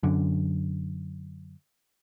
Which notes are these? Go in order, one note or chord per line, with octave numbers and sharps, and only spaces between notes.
F#2 D3